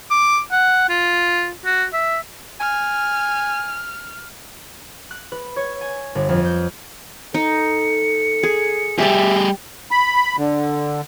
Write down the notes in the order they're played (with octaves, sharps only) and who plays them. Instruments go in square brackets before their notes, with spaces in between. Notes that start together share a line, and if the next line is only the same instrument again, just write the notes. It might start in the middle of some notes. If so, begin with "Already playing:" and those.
[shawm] D6
F#5
F4
F#4
E5
[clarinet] G#5 [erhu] F6
[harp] F#6
B4
C#5
G#5
G1
F2
G6
[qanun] D#4 [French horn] A4 [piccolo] C#7
[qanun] G#4
[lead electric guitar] G3 G#4 [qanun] G4 D5 [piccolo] E5
[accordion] B5
D3